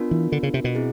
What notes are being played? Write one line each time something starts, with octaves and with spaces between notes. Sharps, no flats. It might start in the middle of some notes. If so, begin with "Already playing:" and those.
Already playing: B3 D4 F4 A#4
E3
D3
C#3
C3
B2
C4 E4 G#4